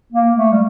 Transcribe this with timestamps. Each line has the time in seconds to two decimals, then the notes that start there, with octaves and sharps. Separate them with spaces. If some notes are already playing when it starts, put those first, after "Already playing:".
0.12 A#3
0.35 A3
0.52 G3